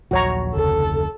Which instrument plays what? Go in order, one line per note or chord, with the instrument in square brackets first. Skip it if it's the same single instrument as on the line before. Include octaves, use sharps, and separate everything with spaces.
[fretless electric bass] A#1 D#2 F#3 [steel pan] F#4 C#5 A#5
[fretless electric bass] F1 D2 C#3 [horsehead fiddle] A4